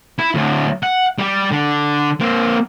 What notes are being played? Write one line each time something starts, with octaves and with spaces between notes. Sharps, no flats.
E4
D2 A2
F#5
G3 G4
D3
A#3 C4